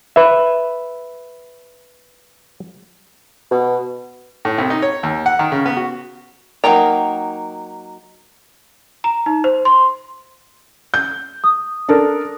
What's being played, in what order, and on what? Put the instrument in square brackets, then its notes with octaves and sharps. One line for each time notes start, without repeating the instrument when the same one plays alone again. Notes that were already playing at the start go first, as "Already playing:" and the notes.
[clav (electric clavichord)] B4 E5
[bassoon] B2
[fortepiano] A2
C2
D#4
C#5
D#2
F#5
D#3
C#3
B3
F#4
[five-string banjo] F#3 A#3 D#4 G5 A#5
[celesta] A#5
D#4
C5
C6
[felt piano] G6
[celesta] D#6
[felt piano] D4 A4 A#4